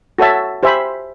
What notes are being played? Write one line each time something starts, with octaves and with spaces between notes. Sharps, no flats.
F#4 A4 C#5 E5 A5
G4 C5 E5 G#5 B5